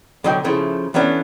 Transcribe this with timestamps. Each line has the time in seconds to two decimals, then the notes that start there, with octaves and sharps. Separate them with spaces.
0.24 B1 D3 F#3 D#5 G5
0.44 C#3 F3 A3 E4
0.94 E3 A3 B3 C#4 D4